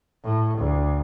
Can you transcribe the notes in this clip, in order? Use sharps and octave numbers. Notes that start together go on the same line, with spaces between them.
A2
D2